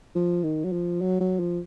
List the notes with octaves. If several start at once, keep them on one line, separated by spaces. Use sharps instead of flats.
F3
D#3
F#3
F3
F#3
F#3
F3